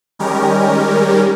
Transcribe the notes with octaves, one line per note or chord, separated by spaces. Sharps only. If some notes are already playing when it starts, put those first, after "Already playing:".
D#3 G3 G#3 C#4 G4 A#4